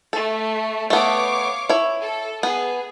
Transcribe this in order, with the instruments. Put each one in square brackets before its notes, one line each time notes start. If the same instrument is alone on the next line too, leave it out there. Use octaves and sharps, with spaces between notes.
[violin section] A3 [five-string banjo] A4
[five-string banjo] A3 B3 [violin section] C#5 F5 D6
[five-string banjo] E4 C#5
[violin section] A4
[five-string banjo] B3 [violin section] G#4